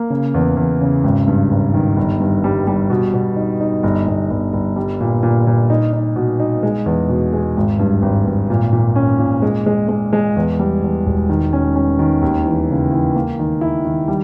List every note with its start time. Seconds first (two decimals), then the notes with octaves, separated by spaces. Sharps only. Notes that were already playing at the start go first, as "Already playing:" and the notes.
Already playing: A#3
0.10 C#3
0.34 E2
0.57 E2
0.81 C#3
1.04 G#1
1.28 G2
1.51 G#1
1.74 D#3
1.97 G1
2.20 G2
2.44 G3
2.67 G3
2.90 B2
3.13 B2
3.36 D#4
3.61 D#4
3.83 G1
4.07 G1
4.30 G1
4.53 G1
4.76 G3
5.00 A#2
5.23 A#2
5.47 A#2
5.70 D#4
5.93 D#4
6.16 B2
6.40 D#4
6.63 G#3
6.86 E2
7.09 B2
7.33 G#3
7.57 G#1
7.79 G2
8.02 G#1
8.27 G#1
8.50 A#2
8.73 A#2
8.96 C#4
9.19 A#2
9.42 G#3
9.66 G#3
9.89 G#3
10.13 G#3
10.36 E2
10.59 G3
10.82 E2
11.06 E1
11.29 D#3
11.53 C#4
11.76 C#4
11.99 D#3
12.22 D#2
12.46 E3
12.69 C#3
12.92 E3
13.15 A#3
13.39 D#3
13.61 E4
13.85 D#3
14.08 G3